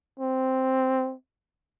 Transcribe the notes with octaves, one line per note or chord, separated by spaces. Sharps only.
C4